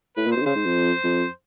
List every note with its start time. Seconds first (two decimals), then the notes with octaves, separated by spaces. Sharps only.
0.17 A2 B4
0.26 A#2
0.32 B2 C5
0.41 D3
0.46 C#3 C5
0.56 G#2
0.65 F2
1.04 F2